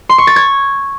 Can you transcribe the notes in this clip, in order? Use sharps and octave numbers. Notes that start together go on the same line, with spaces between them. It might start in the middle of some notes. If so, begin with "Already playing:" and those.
C6
C#6
A6
G#6